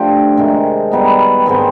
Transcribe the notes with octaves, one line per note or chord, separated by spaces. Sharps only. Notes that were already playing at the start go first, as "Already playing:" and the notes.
Already playing: F3 A3 D4 G4
C3 D#3 G#3
G3 B3 D#4
G#2 D#3 G#3 C4